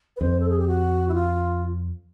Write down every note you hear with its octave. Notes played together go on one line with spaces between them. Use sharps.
B4
F2 C5
A4
G#4
G4
F#4
E4
F4